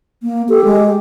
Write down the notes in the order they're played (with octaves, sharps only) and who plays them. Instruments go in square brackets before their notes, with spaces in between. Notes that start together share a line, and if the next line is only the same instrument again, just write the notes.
[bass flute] A#3
[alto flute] G4 [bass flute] A4
[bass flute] G#3